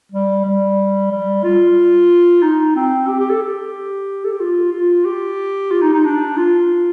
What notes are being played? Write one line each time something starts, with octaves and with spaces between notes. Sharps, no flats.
G3
G3
G3
F4
D#4
C4
G4
G4
A4
G4
A4
G4
F4
F4
G4
F4
D#4
D#4
D4
F4